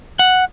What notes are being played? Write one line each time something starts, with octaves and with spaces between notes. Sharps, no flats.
F#5